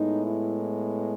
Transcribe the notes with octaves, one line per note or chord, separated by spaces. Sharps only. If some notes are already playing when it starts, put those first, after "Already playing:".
Already playing: A2 G#3 B3 D#4
E4